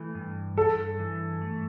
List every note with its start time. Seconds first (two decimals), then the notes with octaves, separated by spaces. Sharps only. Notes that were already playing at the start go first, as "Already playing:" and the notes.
Already playing: E3 A3
0.15 G2
0.57 G2 A4
0.99 E3
1.41 A3